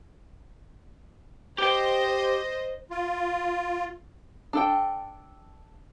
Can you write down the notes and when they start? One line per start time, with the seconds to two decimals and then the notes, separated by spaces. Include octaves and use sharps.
1.58 G4 C5 D#5 G5
2.91 F4
4.53 D4 A4 G5